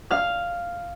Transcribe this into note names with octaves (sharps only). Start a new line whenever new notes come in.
F5 F6